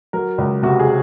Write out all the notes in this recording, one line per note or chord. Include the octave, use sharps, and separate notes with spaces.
F#3 A#4
C#2
C3 F#4
G#4